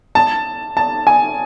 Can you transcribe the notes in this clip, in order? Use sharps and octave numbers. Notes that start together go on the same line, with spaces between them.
A5
A5
G#5